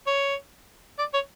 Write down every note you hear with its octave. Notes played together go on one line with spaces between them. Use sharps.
C#5
D5
C#5